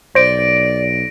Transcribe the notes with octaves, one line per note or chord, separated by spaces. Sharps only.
B1 C5 D5 A#6 D7